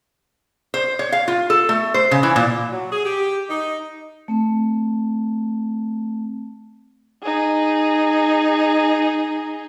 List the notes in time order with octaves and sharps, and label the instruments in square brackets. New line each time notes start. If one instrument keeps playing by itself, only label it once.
[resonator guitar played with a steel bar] C5
C#5
F5
F4
A4
A3
C5
C#3
E3
A#2
[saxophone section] F#3
G#4
G4
D#4
[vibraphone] A3 C4 A5
[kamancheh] D#4 G#4